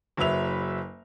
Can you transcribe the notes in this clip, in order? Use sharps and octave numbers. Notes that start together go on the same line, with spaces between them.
F#1 F#3 B4 E5 F7